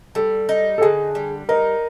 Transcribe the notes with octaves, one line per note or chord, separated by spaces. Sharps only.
G3 A4
D#4
A4
D3 G#4
G3
D#4 A#4